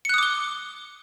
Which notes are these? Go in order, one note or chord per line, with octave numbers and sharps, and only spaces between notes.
D6 D#6 F#6 C#7 G7